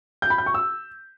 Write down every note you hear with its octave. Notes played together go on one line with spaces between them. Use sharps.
G6
B5
G6
C#6
E6